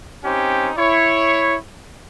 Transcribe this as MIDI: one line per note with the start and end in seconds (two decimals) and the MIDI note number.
0.24 0.70 60
0.24 0.70 61
0.24 0.70 63
0.24 0.70 67
0.77 1.56 64
0.77 1.56 73